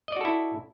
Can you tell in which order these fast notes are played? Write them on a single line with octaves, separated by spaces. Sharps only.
D#5 D5 F#4 A4 E4